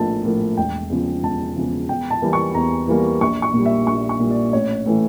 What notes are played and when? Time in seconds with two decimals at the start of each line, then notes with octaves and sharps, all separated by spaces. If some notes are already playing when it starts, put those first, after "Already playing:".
Already playing: A#1 A2 F3 A#3 A5
0.24 A2 F3 A#3
0.57 E1 G5
0.90 E2 C#3 F3
1.23 E1 A5
1.56 E2 C#3 F3
1.89 E2 G5
2.11 A5
2.22 E3 G3 A#3
2.33 C#6
2.54 E2 A#5
2.88 E3 G3 A#3
3.21 A#1 C#6
3.42 C#6
3.54 A#2 G3
3.66 E5
3.87 A#1 C#6
4.09 C#6
4.20 A#2 G3
4.31 D5
4.53 A1 C#5
4.86 A2 E3 A3